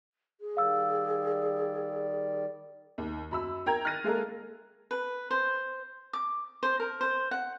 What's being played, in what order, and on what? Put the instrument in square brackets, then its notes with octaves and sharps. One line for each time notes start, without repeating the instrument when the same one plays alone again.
[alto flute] G#4
[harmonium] D#3 G3 D5 [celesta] F5 E6
[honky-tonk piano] D#2
F#2 B5 E6
A#4 G5 A#5 G#6
F6 F#6 A6 A#6 D#7
G#3 A#3 A4 A#4
[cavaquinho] B4
C5
D6
C5
A#4
C5
F#5